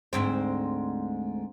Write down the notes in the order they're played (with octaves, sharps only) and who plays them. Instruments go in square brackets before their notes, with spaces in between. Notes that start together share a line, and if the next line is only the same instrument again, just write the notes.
[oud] D2 G#2 C4